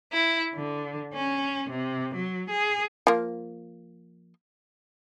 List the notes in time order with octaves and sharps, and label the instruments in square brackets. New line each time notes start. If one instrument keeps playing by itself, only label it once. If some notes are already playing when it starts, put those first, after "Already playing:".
[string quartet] E4
D3
C#4
C3
F#3
G#4
[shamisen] F3 A#3